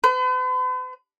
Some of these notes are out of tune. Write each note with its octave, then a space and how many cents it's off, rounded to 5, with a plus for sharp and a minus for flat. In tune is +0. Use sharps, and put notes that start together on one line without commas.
B4 +45